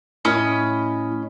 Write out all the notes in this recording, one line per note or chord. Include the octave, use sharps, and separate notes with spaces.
A2 C#4 D#5 B5